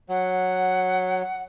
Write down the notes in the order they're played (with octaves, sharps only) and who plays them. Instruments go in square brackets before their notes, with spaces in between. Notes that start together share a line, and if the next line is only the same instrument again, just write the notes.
[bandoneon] F#3 [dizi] F#5